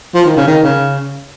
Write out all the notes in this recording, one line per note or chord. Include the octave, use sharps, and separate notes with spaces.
F3
D#3
C#3
D#3
C#3